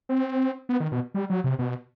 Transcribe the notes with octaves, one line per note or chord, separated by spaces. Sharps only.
C4
B3
D#3
B2
G3
F#3
C3
B2